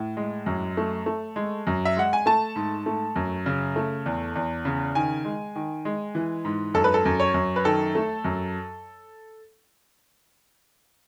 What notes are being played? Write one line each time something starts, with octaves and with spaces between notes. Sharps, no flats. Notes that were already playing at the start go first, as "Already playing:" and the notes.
Already playing: A2
G#3
F#2
A3
A3
G#3
F#2
E5
G#3 F#5
G#5
A3 A5
G#2
A3
F#2
C#3
A3
E2
E2
C#3
D#3 G#5
G#3
D#3
G#3
E3
G#2
F#2 A4
B4
A4
F#2
C#5
F#2
B4
D#3 A4
A3
F#2